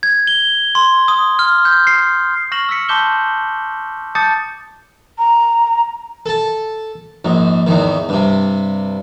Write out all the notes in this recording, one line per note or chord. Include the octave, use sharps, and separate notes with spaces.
G#6
G7
C6
D#6
F6
G6
C7
C#6 F6 A#6 C7 E7 F#7
E6 F6 B6 C#7
A5 C6 D6 G6 E7 G7
A5 D6 D#6 G6 A6 C#7
A#5
A4 A5
A#1 G#2
E2 G#2 D#3
G2 C3